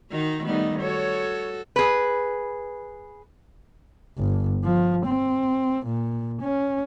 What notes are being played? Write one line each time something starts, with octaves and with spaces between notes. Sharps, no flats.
D#3 D#4 F#4
D#3 G3 A3 B3 D#4
F#4 A4 C#5
G#4 B4
G1
F3
C4
A#2
C#4